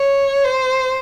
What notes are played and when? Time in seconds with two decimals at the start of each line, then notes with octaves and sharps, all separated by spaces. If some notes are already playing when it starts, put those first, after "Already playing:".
Already playing: C#5
0.44 C5